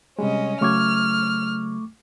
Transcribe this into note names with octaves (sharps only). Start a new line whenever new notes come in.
C3 G3 G#3 C#4 D#5
C#3 F#3 A3 C#6 D6 F6 G#6